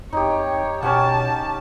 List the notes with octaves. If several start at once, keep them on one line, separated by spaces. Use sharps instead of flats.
F2 D#4 G4 C#5
B2 C#4 G4 F#5 A5